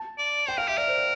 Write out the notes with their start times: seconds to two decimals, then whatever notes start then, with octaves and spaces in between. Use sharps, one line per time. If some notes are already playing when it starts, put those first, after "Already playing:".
Already playing: A5
0.18 D5
0.48 C5 G5
0.58 A#4 F5
0.68 G4 E5
0.78 A#4 D5
0.88 C5
0.98 D5